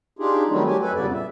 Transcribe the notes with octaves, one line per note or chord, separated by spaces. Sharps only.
D4 D#4 F4 G4 G#4
D#3 F#3 G3 A3 C4
F#3 G4 G#5
F#2 A4 B4 G#5
F2 A#2 C#3 G3 B3 D5
E5